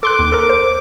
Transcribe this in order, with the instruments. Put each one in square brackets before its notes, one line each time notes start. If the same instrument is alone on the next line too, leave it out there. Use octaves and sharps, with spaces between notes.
[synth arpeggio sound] A4 C6 F#6 [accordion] D6
[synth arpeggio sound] D#2
A4 A#4
C5